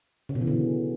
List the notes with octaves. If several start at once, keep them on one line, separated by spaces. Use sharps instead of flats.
C#3
B2
E3
D3